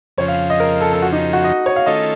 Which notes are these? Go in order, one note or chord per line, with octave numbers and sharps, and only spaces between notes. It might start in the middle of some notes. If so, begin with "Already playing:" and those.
F2 C#3 F3 C#5
F5
D#5
A#4
A4
A4
F#4
D#4
F#4
D#5
C#5
F5
D#3 A3 C#4 F4 A4 D#5